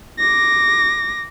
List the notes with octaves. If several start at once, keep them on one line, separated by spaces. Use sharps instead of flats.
D6 A#6